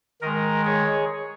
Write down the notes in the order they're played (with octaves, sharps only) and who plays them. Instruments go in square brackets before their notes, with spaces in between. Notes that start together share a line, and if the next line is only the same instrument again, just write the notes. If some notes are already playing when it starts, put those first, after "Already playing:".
[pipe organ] D#3 G#3 A#4 D#5
G#4 C#5